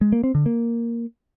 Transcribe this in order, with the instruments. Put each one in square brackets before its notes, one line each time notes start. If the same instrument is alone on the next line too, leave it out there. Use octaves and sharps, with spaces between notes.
[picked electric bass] G#3
A#3
C4
D3
A#3